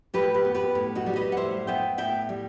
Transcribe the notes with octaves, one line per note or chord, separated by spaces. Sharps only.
A2 G4 B4
G4 B4
B3
G4 B4
A2
D#4 F#4
G3
B4 D#5
F#5
A2 C5 E5
B3 E5 G5
A2 E5 G5
G3